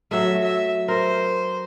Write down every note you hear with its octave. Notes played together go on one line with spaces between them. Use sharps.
F#3 A3 E5
E5
A#4 C5